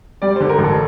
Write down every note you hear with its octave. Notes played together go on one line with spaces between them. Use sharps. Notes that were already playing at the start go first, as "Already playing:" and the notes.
G3 D5
D3 C5
A#4
A1
A4